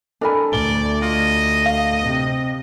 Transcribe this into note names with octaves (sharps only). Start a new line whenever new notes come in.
D4 A4 A#4 G#5 B5
D2 D5 G7
F4 D#5
F5
C3